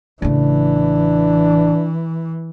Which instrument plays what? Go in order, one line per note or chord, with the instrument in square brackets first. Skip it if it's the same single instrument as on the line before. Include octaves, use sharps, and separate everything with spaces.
[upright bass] A1 C#3 [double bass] E3 [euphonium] D4